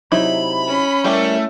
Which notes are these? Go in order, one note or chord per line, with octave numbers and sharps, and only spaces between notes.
C3 F#3 D#4 E4 B5
C#4
G3 A3 E4 G4 A#4